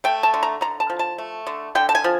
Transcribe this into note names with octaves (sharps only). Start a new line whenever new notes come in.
A3 G5
A5
D3
A#5
D3 A#5
A5
F3
A5
A3
D3
D3 G5
A5
G#5
F3